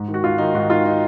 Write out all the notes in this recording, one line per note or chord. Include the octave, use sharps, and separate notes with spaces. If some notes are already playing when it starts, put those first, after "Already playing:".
Already playing: G#2
D#3
F#4
G#2 F4
D#3 D#4
G#2 F#4
D#3 F4
D#4